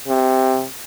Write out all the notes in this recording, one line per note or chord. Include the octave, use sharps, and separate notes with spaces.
C3